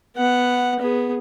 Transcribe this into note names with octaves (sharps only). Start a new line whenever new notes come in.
B3 F#5
B3 G#4